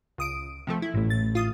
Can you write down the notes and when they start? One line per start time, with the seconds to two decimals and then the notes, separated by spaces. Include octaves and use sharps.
0.18 C#2 D#6 D7
0.67 C3 F3 A3
0.82 E4
0.94 A1 A2
1.10 A6
1.35 F4 D#6